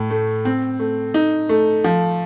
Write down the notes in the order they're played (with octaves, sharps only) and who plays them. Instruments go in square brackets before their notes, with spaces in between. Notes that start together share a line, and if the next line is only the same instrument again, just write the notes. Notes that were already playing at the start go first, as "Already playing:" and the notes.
Already playing: [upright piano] A2
A3
C4
A3
D#4
A3
F3